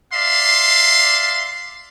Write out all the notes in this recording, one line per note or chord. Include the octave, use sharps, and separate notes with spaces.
D5 E5 F5 C6